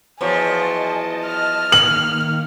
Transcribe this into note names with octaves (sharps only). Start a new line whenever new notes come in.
E2 F3 F#3 D#5 G#5 A5
F6
D#3 A#3 F#7